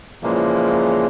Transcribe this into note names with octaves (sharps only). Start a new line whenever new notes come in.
A#2 C#3 E3 F3 G#3 A#3